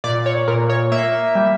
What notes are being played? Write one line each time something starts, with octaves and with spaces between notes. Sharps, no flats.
A#2 D5
C#5
A#2 A#4
C#5
A#3 E5
G3